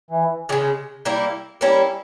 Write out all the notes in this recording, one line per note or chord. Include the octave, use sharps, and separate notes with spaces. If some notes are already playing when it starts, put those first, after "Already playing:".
E3
C#3 E3 G#3
G3 A#3 E4
G3 A#3 C#4 E4